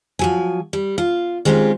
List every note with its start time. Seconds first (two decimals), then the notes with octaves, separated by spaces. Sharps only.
0.19 F3 F#3 G#5
0.73 G3
0.98 F4
1.45 D#3 G#3 C4 C#4 F4 G4